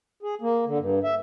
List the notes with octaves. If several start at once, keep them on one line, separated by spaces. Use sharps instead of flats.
G#4
A#3
D3
G2
E5